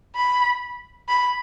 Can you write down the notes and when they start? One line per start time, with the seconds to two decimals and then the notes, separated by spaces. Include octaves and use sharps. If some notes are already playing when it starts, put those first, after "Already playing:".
0.16 B5
1.09 B5